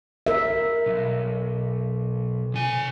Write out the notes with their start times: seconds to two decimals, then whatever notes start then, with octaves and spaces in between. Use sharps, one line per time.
0.27 A#4 E5
0.86 B1
2.54 C3 G#5